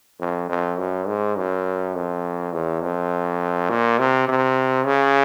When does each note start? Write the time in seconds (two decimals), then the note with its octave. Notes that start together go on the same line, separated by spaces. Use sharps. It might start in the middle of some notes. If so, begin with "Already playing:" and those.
0.20 F2
0.49 F2
0.78 F#2
1.07 G#2
1.36 F#2
1.95 F2
2.53 E2
2.82 F2
3.70 A#2
3.99 C3
4.28 C3
4.86 C#3